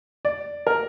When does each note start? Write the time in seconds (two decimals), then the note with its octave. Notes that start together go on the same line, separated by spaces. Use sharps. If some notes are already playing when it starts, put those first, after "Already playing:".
0.25 D5
0.67 A#4